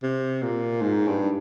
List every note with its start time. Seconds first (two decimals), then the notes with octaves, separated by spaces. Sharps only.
0.03 C3
0.43 A#2
0.81 G#2
1.07 G2